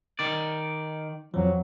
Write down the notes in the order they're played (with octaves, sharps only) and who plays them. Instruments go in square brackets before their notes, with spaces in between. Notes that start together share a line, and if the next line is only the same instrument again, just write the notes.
[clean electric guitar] D#3 D5
[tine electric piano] F2 F3 [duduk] F#3